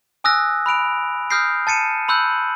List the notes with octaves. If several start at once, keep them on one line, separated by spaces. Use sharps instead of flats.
G#5 D#6 E6 F#6 A#6
B5 F#6 D7 F7
D#6 F6 G6 A#6 C7 D7
A5 A6 C#7 D#7 E7
B5 C6 E6 F#6 G6 F#7